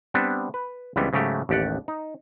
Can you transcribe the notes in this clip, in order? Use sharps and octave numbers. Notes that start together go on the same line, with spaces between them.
G3 B3 C4 D4
B4
C#2 E3 G3 B3 C4
G#2 C#3 F#3 A3 G4
A1 D#2 G4 D5 F#5
D#4